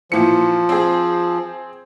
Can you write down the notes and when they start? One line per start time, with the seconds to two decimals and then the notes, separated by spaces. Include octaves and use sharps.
0.12 A#2 E3 F3 C#7
0.69 C4 G#4